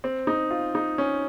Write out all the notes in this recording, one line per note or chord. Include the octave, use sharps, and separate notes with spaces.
C4
D#4
F4
D#4
C#4